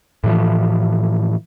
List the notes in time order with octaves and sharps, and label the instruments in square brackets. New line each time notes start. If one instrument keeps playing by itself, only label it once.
[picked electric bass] A2 E3 F3